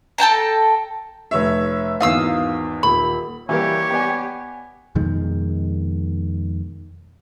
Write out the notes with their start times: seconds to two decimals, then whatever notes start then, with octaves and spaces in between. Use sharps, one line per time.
0.18 A4 G5 A5 A#5
1.31 F1 C#5 E5
2.00 G#1 E2 F5 D#6 E6
2.83 D#1 B5
3.49 E3 G3 A#3 G4 C#5
3.90 B3 D5 G#5
4.95 F2 B2 D#3 G#3